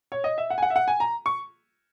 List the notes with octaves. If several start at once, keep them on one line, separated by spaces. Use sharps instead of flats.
C#5
D#5
E5
F#5
G#5
F#5
E5
F#5
G#5
A#5
C#6